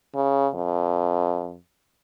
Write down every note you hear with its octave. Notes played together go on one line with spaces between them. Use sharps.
C#3
F2